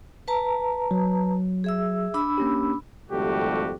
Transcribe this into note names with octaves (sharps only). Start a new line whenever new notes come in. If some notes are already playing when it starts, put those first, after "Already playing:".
B4 A5 A#5
F#3
G#4 E5 E6
D4 B5 E6
A#3 C#4 G4
G#1 F2 G3 A3 F#4 G4